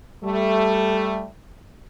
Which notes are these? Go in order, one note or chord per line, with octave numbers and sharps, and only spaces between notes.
G3 A3